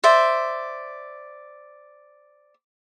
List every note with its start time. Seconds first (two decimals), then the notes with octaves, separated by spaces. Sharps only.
0.04 C5 D5 E5